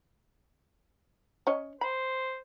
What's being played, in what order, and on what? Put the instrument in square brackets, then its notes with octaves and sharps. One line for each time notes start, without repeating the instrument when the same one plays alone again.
[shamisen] C#4 C#5 D#5
[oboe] C5 [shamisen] B5